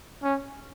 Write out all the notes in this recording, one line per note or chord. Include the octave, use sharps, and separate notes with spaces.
C#4